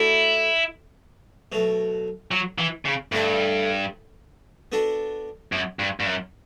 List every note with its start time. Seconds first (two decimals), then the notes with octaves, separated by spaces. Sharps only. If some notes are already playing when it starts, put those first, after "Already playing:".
Already playing: A3 D4 E4 F#4 A4 C#5
1.52 B2 F#3 A3
2.31 F#3
2.58 E3
2.85 C#3
3.12 G2 D3 A3 D4 A4
4.72 B3 D4 F#4 A4
5.52 F#2
5.79 G2
6.00 G2
6.06 F#2